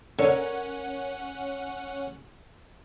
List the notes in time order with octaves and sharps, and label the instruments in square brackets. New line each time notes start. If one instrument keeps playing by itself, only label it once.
[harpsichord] D3 [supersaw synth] C#4 F#5 [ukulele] A#4 C#5